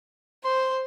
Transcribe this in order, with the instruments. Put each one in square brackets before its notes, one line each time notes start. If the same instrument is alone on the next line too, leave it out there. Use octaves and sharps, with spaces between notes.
[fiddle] C5 [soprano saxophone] C6